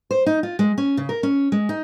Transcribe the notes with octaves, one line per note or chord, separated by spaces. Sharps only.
C5
D#4
F4
G#3
C#4
C#3
A#4
C#4
G#3
D#4